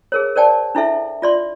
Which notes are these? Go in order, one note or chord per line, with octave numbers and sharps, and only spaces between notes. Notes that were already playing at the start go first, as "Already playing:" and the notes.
G#4 A#4 C#5
A#4 C5 D5 G5 A5
D4 E4 A4 E5
F4 D5 C6